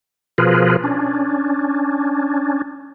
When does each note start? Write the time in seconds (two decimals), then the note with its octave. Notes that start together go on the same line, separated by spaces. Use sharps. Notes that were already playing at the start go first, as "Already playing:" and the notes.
0.38 B2 F3 F4 G#4 A#4 B4
0.84 C#4 D4